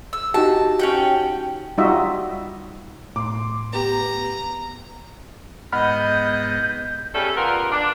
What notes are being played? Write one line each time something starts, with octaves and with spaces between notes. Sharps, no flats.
E6
D#4 F#4 G4 A5
C#4 F#5 G5
G3 D#4 F4 F#4 D#5 E5
A2 C6 D6
B3 G4 A#5
G#2 B3 D#5 F#5 B5 F6 G6
C#3 G3 A3 C#4 A4
A#2 B3 F4 A#4
D4